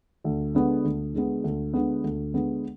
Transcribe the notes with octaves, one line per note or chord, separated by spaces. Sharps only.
D2
D3 G#3 B3
D2
D3 G#3 B3
D2
D3 G#3 B3
D2
D3 G#3 B3